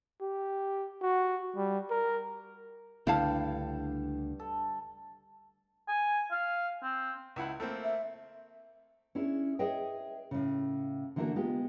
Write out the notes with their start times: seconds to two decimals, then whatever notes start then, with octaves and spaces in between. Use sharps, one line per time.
0.21 G4
1.02 F#4
1.56 G3
1.90 A#4
3.07 C#2 G2 D3 A3 E4 F5 G5 A5
4.40 A4
5.88 G#5
6.32 F5
6.83 C4
7.36 C#2 E4 F#5
7.60 A3 A#3 C4
7.84 E5
9.15 C#4 D4 E4 G#4
9.59 G#4 B4 C#5 D#5 E5 G5
10.31 A2 C#3
11.16 D3 E3 A3 A#3 D4 F#4
11.36 G#3 B3 F4 G4